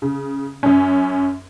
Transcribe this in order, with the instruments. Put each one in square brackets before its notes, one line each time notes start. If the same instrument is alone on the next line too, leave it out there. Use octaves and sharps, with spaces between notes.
[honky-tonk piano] C#3
F#2 C#4